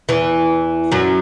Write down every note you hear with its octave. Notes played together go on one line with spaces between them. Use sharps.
E2 E3
F#2 F#3